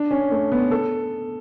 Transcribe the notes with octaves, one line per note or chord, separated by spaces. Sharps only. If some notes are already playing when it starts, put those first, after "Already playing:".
Already playing: D4
C#4
A3
B3
A4